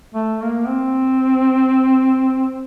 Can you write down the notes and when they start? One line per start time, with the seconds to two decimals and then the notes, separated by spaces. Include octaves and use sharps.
0.14 A3
0.42 A#3
0.68 C4